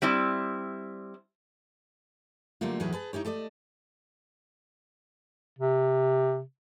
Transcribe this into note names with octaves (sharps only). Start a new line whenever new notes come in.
G3 C4 E4
D3 F#3 G3 A3 A#3 F4
E2 A2 F#3 D#4 G#4 B4
G#4 B4 A5
D#4 E4 G4 C#5
A3 A4 D5 D#5
C3